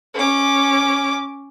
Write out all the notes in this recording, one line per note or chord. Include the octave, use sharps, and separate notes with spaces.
C#4 D6